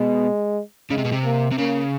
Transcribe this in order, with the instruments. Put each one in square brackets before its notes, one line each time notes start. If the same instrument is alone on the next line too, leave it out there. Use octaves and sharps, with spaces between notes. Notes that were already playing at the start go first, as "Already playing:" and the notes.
Already playing: [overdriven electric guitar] B2 [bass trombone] G#3
[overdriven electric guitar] C#3 [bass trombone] G#3
[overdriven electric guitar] C3
B2
C3
[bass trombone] A#3
[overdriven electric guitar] C3
[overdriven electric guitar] C#3 [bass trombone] A#3